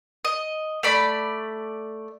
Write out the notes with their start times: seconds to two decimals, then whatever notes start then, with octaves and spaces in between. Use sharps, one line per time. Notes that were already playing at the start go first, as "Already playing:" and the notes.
0.25 D#5
0.83 A3 D5 B5